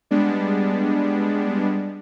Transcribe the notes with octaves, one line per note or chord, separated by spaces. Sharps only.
G3 G#3 B3 D4